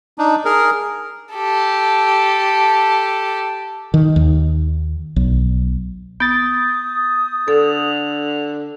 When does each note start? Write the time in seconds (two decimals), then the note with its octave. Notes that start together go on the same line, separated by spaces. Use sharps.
0.18 D4 D#4
0.45 G#4 A#4
1.34 G4 A4
3.94 D#3
4.16 D#2
5.16 B1
6.20 B3 D#6 G6 A6
7.48 D3 A4